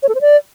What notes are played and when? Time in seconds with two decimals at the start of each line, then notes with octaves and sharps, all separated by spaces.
0.03 C#5
0.09 A4
0.15 C5
0.21 D5